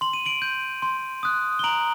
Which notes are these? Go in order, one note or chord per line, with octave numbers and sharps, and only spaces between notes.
C6 F#7
D#7
D7 F#7
G6
C6
D#6 F#6
G7
A#5 D7 F#7